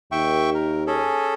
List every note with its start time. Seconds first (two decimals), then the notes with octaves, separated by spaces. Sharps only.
0.12 D#2 E5 G5 C#6
0.54 A#4
0.87 C#4 G#4 A4